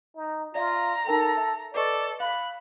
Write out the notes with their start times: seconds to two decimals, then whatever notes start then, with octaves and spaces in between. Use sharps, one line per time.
0.16 D#4
0.55 F4 D5 E5 F5 A#5
1.07 D#4 A4 A#4 G5
1.37 E5
1.75 A4 B4 D5 D#5 C#6
2.20 F5 B5 F#6